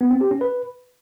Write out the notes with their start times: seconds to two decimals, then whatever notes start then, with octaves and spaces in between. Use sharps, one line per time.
0.01 B3
0.11 C4
0.21 G4
0.31 C#4
0.41 B4